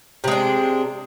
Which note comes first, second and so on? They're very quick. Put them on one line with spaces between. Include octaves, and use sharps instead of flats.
C3 G#3 D4